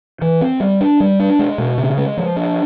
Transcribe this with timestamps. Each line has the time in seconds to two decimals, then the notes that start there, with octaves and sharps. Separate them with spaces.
0.21 E3
0.41 C4
0.60 G3
0.81 D4
1.00 G3
1.20 D4
1.39 G#3
1.58 B2
1.78 C#3
1.98 G#3
2.17 F3
2.36 D4